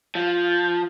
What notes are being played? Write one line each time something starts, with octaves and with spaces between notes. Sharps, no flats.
F3